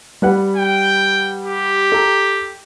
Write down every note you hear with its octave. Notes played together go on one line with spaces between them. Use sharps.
G3 B4 F#5
G5
G4
A4 A5 A#5